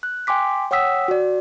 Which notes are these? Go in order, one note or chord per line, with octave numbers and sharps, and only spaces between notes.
F#6
G5 G#5 C6 D6 B6
C#5 F#5 G5 D#6 E6 B6
F#4 D5